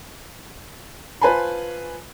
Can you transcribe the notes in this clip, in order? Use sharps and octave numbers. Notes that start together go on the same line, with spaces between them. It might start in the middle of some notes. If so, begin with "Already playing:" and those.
F4 B4 C5 G#5 A5 B5